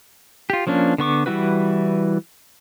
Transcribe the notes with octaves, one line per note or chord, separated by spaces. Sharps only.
F4 G4
F3 A#3 C#4 D4
D3 B3 C#6 D6
E3 G3 E4 F#4 B4